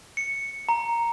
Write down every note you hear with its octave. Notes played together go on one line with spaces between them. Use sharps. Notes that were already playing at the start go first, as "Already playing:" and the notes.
C#7
A#5